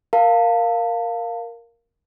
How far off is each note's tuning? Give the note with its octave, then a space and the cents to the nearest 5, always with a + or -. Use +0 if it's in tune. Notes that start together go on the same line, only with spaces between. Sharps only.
A#4 +0 F5 +0 A5 +35